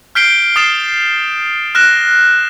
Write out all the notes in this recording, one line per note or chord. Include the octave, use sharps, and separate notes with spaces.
F6 G6 B6 C7 D7 G7
D#6 A6 C7 E7
F6 F#6 A#6 E7